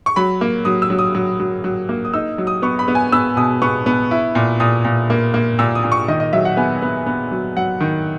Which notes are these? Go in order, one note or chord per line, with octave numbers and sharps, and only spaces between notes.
C#6
F#3 B5
A#3
F#3 D#6
E6
F#3
D#6
F#3
F#3
F#3
A#3
D#6
D#4 E6
F#3
D#6
B3 C#6
B5
B3
G#5
B3 E6
B2 D#6
B3 C#6
B3
E4
A#2
A#2 D#6
A#2
A#3
A#3
A#2 E6
D#6
A#2
C#6
D#3 D#5
D#5
F#3 E5
F#5
B3 G#5
B3
B3
F#3
F#3 F#5
D#3